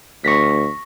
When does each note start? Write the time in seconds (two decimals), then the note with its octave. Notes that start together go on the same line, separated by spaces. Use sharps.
0.24 D2 C#6 A#6 B6